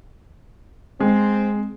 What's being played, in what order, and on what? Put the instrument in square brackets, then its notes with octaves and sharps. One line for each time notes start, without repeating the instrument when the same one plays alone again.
[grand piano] G#3 [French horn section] C4